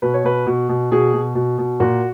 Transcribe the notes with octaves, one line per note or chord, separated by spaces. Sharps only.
B2 B4
C#5
B2 B4
B2
B2
B2 G#4
B2
B2
B2
A#2 F#4